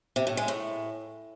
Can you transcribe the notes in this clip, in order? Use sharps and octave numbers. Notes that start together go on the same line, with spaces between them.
C3
A2
G#3
A2